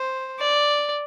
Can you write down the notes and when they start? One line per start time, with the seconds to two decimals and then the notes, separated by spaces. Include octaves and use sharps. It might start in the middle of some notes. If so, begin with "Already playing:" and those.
Already playing: C5
0.40 D5